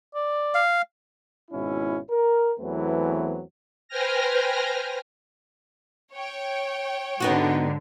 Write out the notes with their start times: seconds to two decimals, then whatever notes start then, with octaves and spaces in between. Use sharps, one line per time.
0.15 D5
0.54 F5
1.51 G#1 G#2 B2 C#4 E4
2.10 A#4
2.60 E2 E3 F#3 A3 B3 C4
3.88 B4 C5 G5 G#5 F6 A#6
6.13 C#5 G5
7.20 G#2 D3 B3 D#4 F#4